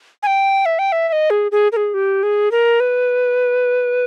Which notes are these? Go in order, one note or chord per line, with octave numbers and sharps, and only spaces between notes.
G#5
G5
E5
G5
E5
E5
D#5
G#4
G#4
A#4
G#4
G4
G#4
A#4
B4